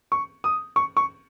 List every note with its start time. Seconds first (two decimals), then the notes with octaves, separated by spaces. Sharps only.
0.12 C#6
0.44 D#6
0.76 C#6
0.97 C#6